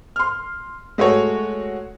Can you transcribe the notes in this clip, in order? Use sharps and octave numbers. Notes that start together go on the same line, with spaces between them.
C6 F6
G#3 A3 F#4 C#5 F#5